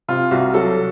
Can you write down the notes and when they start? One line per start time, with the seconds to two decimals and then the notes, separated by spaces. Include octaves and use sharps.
0.09 C3 F4
0.31 C2 F#4
0.54 F#3 A4